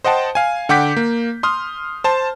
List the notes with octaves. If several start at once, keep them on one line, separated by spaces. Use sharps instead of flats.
C5 D#5 F#5 G5 A5
F5 G#5
D3 F#5 G5 D6 G6 B6
A#3
C6 D#6 F6
C5 A5